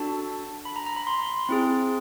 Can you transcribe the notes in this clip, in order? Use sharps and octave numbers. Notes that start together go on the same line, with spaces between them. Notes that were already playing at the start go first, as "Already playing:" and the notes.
Already playing: D4 F#4 A4 A5
B5
A#5
A#5
B5
C6
C4 E4 G#4